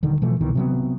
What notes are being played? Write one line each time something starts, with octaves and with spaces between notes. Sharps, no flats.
D#1 D3 D#3
B2 E3 F3 A3
C2 B2 D#3 E3
C3 F#3 B3